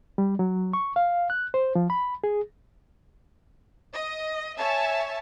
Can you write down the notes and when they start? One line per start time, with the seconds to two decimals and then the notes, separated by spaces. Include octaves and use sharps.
0.18 G3
0.39 F#3
0.73 C#6
0.96 F5
1.30 F#6
1.54 C5
1.75 F3
1.90 B5
2.24 G#4
3.92 D#5
4.59 C#5 E5 G#5 A5